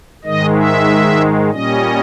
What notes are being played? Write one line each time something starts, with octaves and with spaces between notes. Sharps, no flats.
G#2 D#3 G#3 D#5
E5
A#2 G3 C#4 D#5